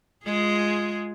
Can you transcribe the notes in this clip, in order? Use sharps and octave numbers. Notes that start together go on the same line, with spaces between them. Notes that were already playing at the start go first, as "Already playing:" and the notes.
G#3 F4 G#4